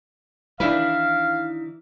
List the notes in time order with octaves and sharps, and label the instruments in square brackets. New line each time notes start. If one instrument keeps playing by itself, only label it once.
[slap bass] D#3 E3 [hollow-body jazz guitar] D4 E4 B4 [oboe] F5